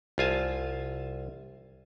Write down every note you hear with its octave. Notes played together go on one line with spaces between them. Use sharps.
C2 F4 G#5 A5